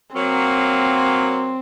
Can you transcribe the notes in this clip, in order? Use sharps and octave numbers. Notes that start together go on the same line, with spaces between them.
F#3 A#3 C4